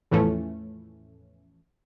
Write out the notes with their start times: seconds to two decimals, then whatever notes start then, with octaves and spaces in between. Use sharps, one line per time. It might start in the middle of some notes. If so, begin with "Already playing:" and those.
0.11 E2 A2 E3 F3 A3 C#4